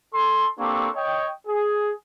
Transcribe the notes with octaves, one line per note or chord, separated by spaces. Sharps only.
A4 C6
A#3 C4 D4 G4 A4 C#6
C#5 D#5 G5
G#4